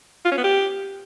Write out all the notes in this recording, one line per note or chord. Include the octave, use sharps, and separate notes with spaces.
F4
C#4
B3
G4